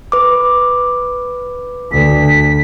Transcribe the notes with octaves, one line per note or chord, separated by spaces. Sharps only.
B4 D6
D2 B6